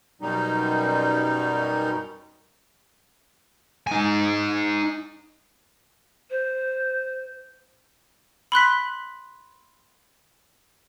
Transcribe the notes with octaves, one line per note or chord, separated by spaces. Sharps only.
F#2 B2 G3 D#4
D#4 G#5
C5
B5 C6 F#6 B6